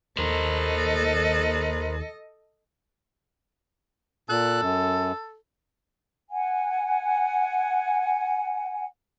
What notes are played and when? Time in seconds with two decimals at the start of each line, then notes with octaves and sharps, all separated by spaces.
0.19 D#2 A4 A#4 C5 D#5
4.29 A#2 A4 F#6
4.62 F#2
6.30 F#5 G#5